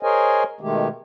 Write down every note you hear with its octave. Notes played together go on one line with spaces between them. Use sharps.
G#4 A#4 C5 C#5 D#5 G#5
B2 D#3 G#3 A3 G4